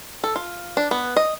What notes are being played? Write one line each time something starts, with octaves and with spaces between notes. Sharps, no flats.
A4
F4
D4
B3
D#5